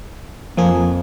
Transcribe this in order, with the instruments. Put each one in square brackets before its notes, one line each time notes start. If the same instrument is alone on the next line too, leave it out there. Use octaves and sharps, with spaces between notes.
[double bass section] F2 [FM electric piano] F3 A#3 G#4